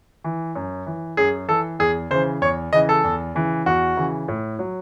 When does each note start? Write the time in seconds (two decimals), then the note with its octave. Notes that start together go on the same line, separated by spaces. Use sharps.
0.24 E3
0.55 F#2
0.86 E3
1.17 F#2 G#4
1.48 E3 A4
1.79 E2 G#4
2.11 C#3 E3 C5
2.41 E2 C#5
2.73 C#3 E3 D#5
2.89 A4
3.04 E2
3.35 C#3 E3
3.66 E2 F#4
3.97 C#3 E3
4.28 A2
4.59 F#3